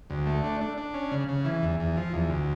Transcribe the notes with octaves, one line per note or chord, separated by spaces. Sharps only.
D2
A3
D4
D4
D4
C#4
C#3
C#3
E3
E2
E2
F3
E2
D2